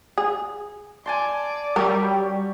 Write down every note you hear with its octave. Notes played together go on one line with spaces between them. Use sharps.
G#4
D5 G#5 A5 C6
F#3 G3 G4 A#4 C#6